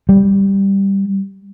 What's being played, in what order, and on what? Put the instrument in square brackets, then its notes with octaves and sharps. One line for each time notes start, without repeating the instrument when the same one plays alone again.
[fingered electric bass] G3